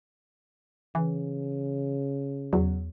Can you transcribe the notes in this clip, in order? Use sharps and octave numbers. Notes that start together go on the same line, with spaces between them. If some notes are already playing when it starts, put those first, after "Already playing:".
C#3 E3
E2 F#3